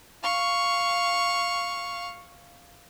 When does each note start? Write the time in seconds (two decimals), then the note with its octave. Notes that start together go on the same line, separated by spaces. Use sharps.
0.23 F5 C#6